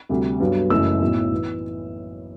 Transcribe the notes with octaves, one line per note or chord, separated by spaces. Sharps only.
D2 C3 G3
G2 F#3 B3
F#1 F#2 E3 A3 E6
B1 A2 F#3
E3 B3